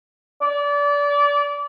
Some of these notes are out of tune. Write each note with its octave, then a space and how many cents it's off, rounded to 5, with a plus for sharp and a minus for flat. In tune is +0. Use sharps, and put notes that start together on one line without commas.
D5 -30